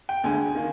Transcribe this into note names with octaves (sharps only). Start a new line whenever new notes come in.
G5
D2 D3 G#3 G#5
D#3 A#3